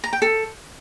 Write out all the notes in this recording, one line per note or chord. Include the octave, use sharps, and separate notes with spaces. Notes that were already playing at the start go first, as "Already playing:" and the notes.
A#5
G5
A4